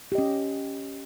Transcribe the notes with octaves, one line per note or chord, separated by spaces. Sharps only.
C#4 G4 D#5